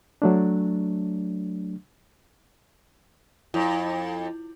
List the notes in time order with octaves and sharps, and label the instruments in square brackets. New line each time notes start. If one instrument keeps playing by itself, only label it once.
[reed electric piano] F#3 A3 D4
[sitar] F2 [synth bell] E4